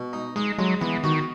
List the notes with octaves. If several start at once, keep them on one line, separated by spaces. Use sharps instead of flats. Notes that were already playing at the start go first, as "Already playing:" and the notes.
Already playing: B2
D#4
G#3 D#4
F#3 G#3
E3 B3
D#3 F#4